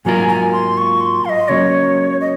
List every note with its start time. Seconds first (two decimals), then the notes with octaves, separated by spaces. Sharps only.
0.05 G#2 F#3 A#3 F4 A#4 G#5
0.29 G#5
0.53 C6
0.77 C#6
1.00 C6
1.25 F5
1.29 D#5
1.49 C#2 C#3 F#3 A#3 C#5
2.21 D#5